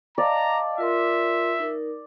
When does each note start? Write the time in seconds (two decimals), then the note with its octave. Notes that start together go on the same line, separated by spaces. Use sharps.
0.18 D5 D#5 F5 A5 A#5
0.78 F4 A#4 E5 C6
1.59 D#4 A#4